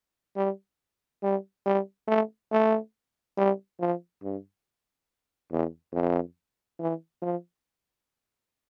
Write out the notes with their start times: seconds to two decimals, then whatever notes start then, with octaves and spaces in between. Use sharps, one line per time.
0.36 G3
1.23 G3
1.66 G3
2.08 A3
2.52 A3
3.37 G3
3.80 F3
4.23 G2
5.51 E2
5.93 F2
6.79 E3
7.22 F3